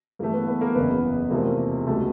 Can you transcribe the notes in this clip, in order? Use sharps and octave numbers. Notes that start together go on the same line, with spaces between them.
G2 E3 A3 A#3 A#4
B3 B4
B3 B4
A#3 A#4
F#1 E2 C#3 B3 B4
E2 C3 F3 A3 A#3 A#4
G#4
C#2 B2 G3 A3 A4